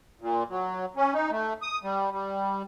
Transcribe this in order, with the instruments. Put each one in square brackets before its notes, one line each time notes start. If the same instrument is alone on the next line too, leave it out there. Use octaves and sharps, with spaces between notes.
[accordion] A#2
F#3
C#4
D#4
A3
D#6
G3
G3